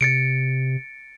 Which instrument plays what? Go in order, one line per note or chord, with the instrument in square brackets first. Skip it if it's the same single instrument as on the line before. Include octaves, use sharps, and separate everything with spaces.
[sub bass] C3 [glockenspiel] A6 C#7 D7